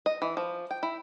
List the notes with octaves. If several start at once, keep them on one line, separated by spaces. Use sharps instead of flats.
D#5
E3
F3
G5
E4